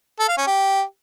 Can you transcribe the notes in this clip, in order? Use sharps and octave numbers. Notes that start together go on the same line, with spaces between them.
A4
F5
C#4
G4